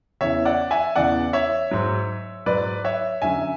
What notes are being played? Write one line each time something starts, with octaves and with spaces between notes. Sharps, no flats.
E2 C#3 E3 C#5 E5
D5 F#5
E5 G#5
E2 C#3 E3 D5 F#5
C#5 E5
G#2 F#3
G#2 F#3 B4 D5
C#5 E5
F#2 D3 F#3 E5 G#5